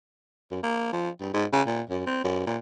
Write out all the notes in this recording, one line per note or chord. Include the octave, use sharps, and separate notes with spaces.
F#2
A#3
F3
G2
G#2
C#3
A#2
F#2
C4
F#2
A#2